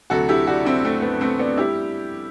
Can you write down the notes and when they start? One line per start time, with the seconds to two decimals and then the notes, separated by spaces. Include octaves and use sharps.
0.10 D2 C3 F#3 F#4 A4
0.29 E4 G4
0.47 D4 F#4
0.65 C4 E4
0.85 A3 C4
1.02 B3
1.21 A3 C4
1.39 B3 D4
1.57 G3 E4 G4